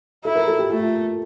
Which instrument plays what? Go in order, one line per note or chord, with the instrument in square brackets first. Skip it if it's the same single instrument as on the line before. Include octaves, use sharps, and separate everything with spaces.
[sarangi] E4 [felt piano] A4
[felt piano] A#4
A4
G4
[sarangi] A3 [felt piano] F4